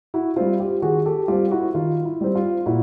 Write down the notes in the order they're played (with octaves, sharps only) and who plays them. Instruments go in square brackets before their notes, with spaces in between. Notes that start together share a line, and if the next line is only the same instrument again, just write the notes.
[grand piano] E4 F#4
G3 C4 F4
F4 G4
D#3 F#4 G#4
G4 A4
G3 C4 F4 G4
E4 F#4
D#3 F4
E4
G3 C4
F4
A#2 E4 F#4